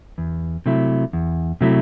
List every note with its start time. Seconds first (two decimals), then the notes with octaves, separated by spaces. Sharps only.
0.18 E2
0.66 C3 F#3 A3 E4
1.13 E2
1.61 C3 F#3 A3 E4